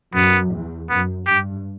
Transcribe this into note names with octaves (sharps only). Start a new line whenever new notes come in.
F#2 B3
E2
F#2 B3
G2 G4